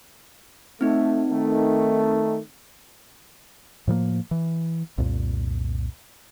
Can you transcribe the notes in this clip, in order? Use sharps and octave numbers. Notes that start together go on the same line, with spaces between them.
A3 C4 D#4
D#3 A3
A2 F3 G3 A#3
E3
C2 F2 A#2